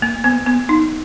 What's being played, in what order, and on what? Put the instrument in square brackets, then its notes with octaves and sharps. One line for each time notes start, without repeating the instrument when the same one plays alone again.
[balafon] A#3
B3
B3
D#4